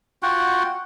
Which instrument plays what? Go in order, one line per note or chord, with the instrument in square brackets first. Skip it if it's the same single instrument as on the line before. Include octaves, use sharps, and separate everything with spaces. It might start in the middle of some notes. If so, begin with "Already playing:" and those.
[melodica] F4 F#4 F#5 G5